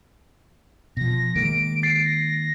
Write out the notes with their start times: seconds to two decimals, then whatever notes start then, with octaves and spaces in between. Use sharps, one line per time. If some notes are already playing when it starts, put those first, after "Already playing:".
0.97 B2 F3 A#6
1.35 D#3 G#3 A#3 D7
1.83 A6 C7
2.05 A#6